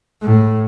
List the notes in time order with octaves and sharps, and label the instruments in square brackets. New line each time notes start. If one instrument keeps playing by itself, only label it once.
[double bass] A2